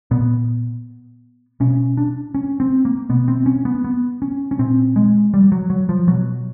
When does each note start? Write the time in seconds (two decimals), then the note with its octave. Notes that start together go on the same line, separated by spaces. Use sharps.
0.11 A#2 B3
1.60 B2 C#4
1.97 D4
2.35 C#4
2.60 C4
2.85 A#3
3.09 B2 B3
3.28 C4
3.46 C#4
3.65 B3
3.84 B3
4.22 C#4
4.51 C#4
4.59 A#2 C4
4.96 G#3
5.34 G3
5.52 F#3
5.70 F#3
5.89 F3
6.07 B2 F#3